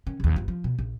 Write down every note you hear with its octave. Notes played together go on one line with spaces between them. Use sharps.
D#3 C#4
A#1 D#2
G1 F4
F3
B2
A#1